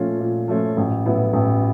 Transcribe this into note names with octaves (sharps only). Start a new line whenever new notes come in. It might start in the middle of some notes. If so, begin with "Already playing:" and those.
Already playing: A#2 F3 A3 C#4 F4
A#2
F3 A3 C#4 F4
A1
A2 F#3 B3 E4
A1